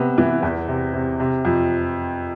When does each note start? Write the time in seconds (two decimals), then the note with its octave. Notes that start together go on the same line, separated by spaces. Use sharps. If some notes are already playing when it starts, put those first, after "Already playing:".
Already playing: C3 B3
0.18 E3
0.43 E2
0.68 C3
0.93 C3
1.20 C3
1.45 F2